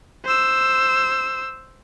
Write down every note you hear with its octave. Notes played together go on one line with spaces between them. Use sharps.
C5 E6